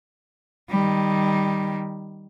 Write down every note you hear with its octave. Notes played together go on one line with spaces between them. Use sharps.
D#3 G3